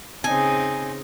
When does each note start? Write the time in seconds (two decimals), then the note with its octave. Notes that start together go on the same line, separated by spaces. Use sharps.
0.24 C#3 C4 D#4 G#5